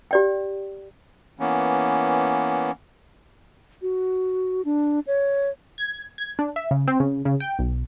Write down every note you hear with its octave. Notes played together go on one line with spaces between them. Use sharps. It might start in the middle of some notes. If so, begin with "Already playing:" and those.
G4 D5 G5
E3 A#3 B3 C#4
F#4
D4
C#5
G#6
G#6
D4
E5
C#3
C4
C#3
C#3
G5
B1